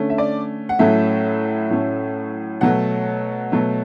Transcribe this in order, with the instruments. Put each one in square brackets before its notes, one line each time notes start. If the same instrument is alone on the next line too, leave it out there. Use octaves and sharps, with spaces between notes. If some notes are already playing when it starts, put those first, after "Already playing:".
Already playing: [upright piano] D3 A3 C#4
E5
D5
F#5
A2 F#3 A3 C#4 E5
A2 F#3 A3 C#4
B2 F#3 A3 F#5
B2 F#3 A3